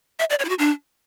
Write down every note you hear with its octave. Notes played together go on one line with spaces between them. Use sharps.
E5
D5
C#5
E4
F#4
D4